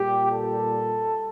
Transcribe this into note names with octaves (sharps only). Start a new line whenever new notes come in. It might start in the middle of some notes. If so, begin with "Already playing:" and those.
Already playing: A#2 G3 G4
A4